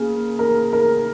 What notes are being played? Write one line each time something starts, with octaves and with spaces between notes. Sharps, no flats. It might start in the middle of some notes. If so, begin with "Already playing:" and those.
Already playing: C#3 A#3
A#4
A#4